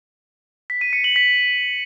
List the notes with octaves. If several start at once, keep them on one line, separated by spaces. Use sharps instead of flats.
B6
D#7
C#7
F#7
B6